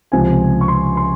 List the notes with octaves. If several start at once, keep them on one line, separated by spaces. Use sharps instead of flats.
C#2 C3 F3 C4 G#5
C#6
C6
C6